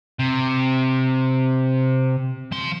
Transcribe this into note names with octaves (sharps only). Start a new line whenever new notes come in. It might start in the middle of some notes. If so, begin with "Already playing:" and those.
C3
F3 C6